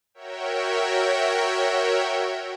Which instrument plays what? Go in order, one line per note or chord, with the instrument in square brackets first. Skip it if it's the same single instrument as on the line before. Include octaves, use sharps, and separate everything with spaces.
[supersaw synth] F#4 A#4 C#5 E5 G5